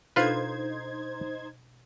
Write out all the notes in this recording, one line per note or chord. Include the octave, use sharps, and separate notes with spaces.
B2 D4 D#4 F4 A4 B4 C5 G#6